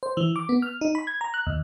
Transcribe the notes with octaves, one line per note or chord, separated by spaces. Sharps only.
C5
E3
D6
B3
F6
D#4
B5
G#6
A#5
F#6
D#2